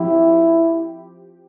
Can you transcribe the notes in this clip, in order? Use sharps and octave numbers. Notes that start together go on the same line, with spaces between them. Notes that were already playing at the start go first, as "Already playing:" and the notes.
Already playing: F3 C4 E4 G4